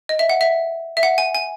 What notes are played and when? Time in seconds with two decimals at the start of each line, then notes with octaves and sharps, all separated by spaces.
0.09 D#5
0.19 E5
0.29 F#5
0.41 E5
0.97 E5
1.03 F#5
1.18 G#5
1.35 G#5